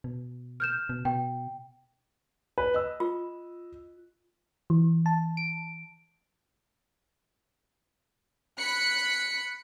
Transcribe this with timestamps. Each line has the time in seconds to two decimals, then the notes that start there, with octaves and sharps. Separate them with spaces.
0.04 B2
0.60 F6 G6 E7
0.89 B2
1.05 B2 G5
2.58 B4
2.74 D#5 E6
3.00 F4
4.70 E3
5.06 A5
5.37 D7
8.58 B5 F#6 C#7